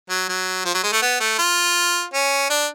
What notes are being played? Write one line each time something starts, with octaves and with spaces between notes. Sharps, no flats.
F#3
F#3
F3
F#3
G#3
A3
B3
A3
F4
C#4
D4